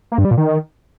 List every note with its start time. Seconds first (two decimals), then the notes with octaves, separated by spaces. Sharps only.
0.12 A#3
0.18 G2
0.25 G3
0.31 A#2
0.37 D#3